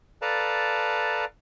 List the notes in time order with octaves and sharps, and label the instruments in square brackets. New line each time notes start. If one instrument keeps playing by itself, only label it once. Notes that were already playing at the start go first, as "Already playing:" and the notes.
[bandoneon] A4 B4 D5 F5 A5 A#5